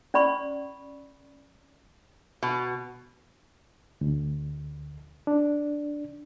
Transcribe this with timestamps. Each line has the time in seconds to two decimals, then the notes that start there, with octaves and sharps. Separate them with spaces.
0.14 C#4 D5 B5 C#6
2.43 B2
4.01 D2
5.27 D4